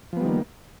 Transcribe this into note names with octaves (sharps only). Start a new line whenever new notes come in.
D#3 F3 G3 A#3 B3